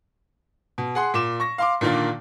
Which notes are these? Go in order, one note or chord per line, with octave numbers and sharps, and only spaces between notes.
B2
G#4 F#5 C6
A#2 D6 E7
C#6 A#6
F5 C6 D6
A#2 D3 D#3 A#3 D4